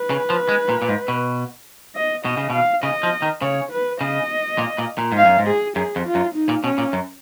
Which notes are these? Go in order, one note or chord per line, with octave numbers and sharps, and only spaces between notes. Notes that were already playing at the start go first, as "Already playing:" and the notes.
Already playing: B4
C#3
F3
G#3
A#2
A#2
G#2
B2
D#5
B2 D#5
C#3
B2 F5
C#3 D#5
F3
D#3
C#3 C#5
B4
C#3 D#5
A#2
A#2
A#2
G#2
F5
F#2
G#2
G#4
F#2 G#4
F2
F4
F#2
D#4
A#2
B2 C#4
A#2
F#2